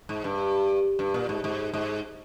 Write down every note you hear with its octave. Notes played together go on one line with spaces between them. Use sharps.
G#2
G2
G2
A#2
G#2
G#2
G#2